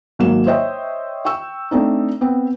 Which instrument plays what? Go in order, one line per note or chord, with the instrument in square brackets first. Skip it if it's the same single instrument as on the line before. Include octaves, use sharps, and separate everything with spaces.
[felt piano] G#1 F#3 A#3 E7
C5 C#5 D#5 E5 G5
G5 C#6 E6
A3 C4 D4 D#4
B3 C4